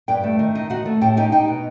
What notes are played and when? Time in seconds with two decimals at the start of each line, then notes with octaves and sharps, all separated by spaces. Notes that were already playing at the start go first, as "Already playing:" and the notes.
0.08 G2 G4 G5
0.24 A3
0.39 D#3
0.55 D#4
0.70 D#4 F#4 F#5
0.86 A3
1.01 A2 G4 G5
1.17 D#4 G4 G5
1.32 D#4 G4 G5
1.48 B2